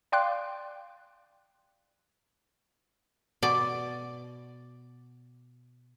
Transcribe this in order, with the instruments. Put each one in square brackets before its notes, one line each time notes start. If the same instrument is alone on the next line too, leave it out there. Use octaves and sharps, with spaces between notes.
[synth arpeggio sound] D5 F5 G5 C6 D6 F#6
[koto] B2 D5